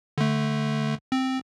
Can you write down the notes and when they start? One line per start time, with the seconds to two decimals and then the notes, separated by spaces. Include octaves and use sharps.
0.18 D3 A3
1.12 C4